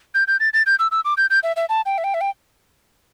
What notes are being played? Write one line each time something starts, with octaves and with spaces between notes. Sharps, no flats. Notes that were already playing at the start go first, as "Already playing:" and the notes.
G6
G6
A6
A6
G6
E6
E6
D6
G6
G6
E5
E5
A5
G5
E5
G5
E5
G5